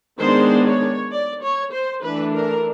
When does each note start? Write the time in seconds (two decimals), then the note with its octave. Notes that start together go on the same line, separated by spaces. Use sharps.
0.19 D#3 G#3 B3 D4 C5
0.65 C#5
1.11 D5
1.42 C#5
1.72 C5
2.03 E3 A3 D4 B4
2.34 A#4